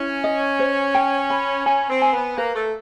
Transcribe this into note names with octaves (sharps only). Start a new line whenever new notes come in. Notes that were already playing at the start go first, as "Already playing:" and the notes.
Already playing: C#4 E4
D#5
C5
G5
B5
C#4 G#5
C4
G#5
B3
A#3 B4
A3